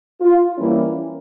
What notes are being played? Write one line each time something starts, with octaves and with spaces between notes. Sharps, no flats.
F4
E3 G3 A#3 C#4 E4